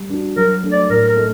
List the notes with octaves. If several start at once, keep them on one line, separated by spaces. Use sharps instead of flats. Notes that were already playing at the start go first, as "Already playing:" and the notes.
Already playing: G3
D4 F#4
F#3 A#4
A3 D4
D5
A2 A#4
A#4
A3 D#4